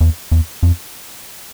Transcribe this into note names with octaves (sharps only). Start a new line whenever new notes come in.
E2
E2
F2